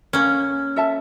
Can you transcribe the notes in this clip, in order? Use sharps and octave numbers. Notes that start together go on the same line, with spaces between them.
A#3 C#4
A4 E5 A5